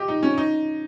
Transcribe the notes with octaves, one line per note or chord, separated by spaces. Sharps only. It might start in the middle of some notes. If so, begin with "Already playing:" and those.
Already playing: G4 D#5
D#4
C#4
D#4